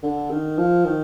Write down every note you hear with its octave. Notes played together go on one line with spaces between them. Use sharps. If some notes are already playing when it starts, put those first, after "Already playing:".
D3
D#3
F3
D#3